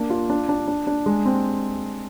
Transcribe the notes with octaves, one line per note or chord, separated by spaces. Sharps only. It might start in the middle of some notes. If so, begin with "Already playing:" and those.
Already playing: A#3 D4
F4
D4
D4
D4
D4
G#3
C4